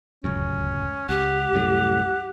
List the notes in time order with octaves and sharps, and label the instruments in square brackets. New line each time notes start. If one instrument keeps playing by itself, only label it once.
[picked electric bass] D1 C#2 F#2 [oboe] C#4
[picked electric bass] C#2 [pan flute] G4 [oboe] F#5
[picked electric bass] C2 F#2 A2